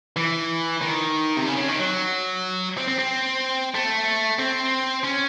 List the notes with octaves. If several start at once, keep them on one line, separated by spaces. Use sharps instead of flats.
E3
D#3
C3
C#3
C#3
D#3
F#3
C4
C4
C4
A3
C4
C#4